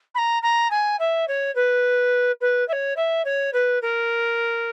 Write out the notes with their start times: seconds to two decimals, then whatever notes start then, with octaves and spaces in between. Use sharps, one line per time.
0.15 B5
0.18 A#5
0.43 A#5
0.71 G#5
0.99 E5
1.28 C#5
1.55 B4
2.41 B4
2.68 E5
2.73 C#5
2.97 E5
3.25 C#5
3.53 B4
3.82 A#4